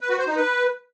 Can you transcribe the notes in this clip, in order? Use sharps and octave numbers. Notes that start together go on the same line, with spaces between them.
B4
F#4
C5
D#4
B4